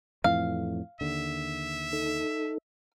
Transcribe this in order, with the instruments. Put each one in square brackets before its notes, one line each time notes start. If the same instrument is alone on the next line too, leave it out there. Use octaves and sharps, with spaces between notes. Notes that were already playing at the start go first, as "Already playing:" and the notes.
[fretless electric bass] F2 A2 E3 [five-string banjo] F5
[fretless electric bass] D#2 D3 [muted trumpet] E5
[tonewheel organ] D#4 A4